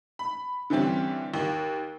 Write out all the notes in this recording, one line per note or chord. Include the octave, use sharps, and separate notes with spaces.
B5
D3 E3 G3 C4 C#4
D#2